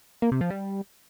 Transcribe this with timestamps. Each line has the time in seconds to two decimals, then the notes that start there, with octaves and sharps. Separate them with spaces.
0.22 A#3
0.32 C3
0.41 F3
0.50 G3